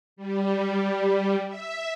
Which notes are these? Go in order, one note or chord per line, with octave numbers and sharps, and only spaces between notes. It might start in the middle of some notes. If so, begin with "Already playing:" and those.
G3
E5